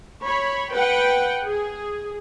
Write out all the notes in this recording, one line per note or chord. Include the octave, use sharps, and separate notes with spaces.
C#5 B5
B4 F#5 G5
G#4